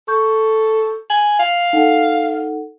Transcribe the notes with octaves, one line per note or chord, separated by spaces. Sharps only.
A4 C#6 G6
G#5 F#7
F5
D#4 A4 F#5